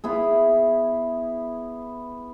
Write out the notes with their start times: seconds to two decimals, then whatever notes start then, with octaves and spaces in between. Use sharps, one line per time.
0.04 B3 E4 G#4